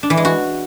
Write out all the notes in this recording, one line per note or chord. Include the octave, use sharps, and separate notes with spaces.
D4
E3
G#3
F#4